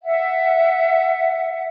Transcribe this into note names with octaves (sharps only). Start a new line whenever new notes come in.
E5 F#5